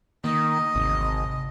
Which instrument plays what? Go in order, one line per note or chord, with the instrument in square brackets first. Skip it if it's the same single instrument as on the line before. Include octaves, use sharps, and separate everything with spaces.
[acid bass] D#3 [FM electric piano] A#3 [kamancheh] D#5
[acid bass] G#1 [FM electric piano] D2 C3